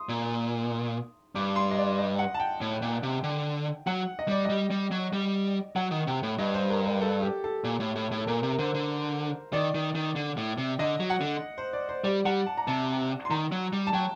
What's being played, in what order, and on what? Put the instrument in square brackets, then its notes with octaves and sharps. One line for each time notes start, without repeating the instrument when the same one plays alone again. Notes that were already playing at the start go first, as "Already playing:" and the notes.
Already playing: [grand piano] C6 D#6
[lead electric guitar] A#2
[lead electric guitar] G2 [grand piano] D6
[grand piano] C6
D#5
D5
D#5
F#5
A5
G5
[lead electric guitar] A2
A#2
C3
D3
[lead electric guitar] F#3 [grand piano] F#5
[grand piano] D#5
[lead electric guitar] G3 [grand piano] D5
[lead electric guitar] G3 [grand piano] D#5
[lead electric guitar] G3
F#3
G3
[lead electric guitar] F#3 [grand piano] F#5
[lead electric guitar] D#3
[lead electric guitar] C3 [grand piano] G5
[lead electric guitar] A2
[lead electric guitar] G2 [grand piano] D#5
[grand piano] C5
A#4
A#4
A4
G4
A4
[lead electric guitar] A#2
A2
A2
A2
[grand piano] A4
[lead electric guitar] A#2 [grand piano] A#4
[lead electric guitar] C3
[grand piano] A#4
[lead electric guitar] D3 [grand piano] C5
[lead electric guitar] D3
[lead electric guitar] D#3 [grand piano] D5
[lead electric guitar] D#3
D#3
D3
A2
C3
[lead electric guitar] D3 [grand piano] D#5
[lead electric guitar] F#3
[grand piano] F#5
[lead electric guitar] D3
[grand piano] C5
D5
C5
[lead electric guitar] G3 [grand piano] D5
[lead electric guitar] G3 [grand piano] F#5
[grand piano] A5
A#5
[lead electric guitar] C3 [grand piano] A5
[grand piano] C6
[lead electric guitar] D#3 [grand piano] A#5
[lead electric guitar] F#3
G3
[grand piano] A5
[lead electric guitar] F#3 [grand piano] G5